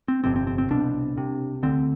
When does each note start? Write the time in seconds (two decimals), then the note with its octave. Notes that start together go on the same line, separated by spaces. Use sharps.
0.08 C4
0.24 G1 F2 C3 C4
0.36 C4
0.47 C4
0.58 C4
0.70 C2 B2 D4
1.17 C2 C3
1.63 D2 D3 C4